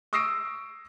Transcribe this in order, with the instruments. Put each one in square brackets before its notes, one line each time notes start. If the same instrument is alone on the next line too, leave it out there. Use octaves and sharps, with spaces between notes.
[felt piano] C#6 D#6 E6 A#6 C7 D7